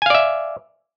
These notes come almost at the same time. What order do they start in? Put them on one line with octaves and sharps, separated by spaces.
G#5 F5 D5 E5